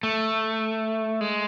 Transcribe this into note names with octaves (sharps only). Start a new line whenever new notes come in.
A3
G#3